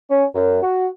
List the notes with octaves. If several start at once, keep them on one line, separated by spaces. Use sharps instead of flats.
C#4
F#2
F#4